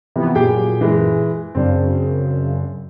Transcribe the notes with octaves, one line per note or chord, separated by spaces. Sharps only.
C3 E3 F3 B3
F#2 A#2 G4 G#4 G5
E3 G#3
F#2 C#3 C4 D4